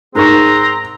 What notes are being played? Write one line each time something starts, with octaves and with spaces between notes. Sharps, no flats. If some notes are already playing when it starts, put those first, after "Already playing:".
G#2 C4 G#4 A#4 A#5 C#6